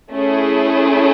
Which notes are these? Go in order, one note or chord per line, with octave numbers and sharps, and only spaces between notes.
A3 C#4 E4 G#4